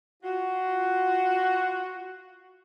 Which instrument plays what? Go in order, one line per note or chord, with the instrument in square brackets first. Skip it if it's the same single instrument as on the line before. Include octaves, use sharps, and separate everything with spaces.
[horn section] F4 F#4